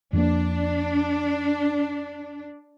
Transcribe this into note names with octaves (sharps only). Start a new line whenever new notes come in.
F2 F3 A#3 D4